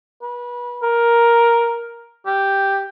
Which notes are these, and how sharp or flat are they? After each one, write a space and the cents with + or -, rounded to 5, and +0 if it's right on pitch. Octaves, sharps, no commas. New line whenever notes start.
B4 -30
A#4 +5
G4 +0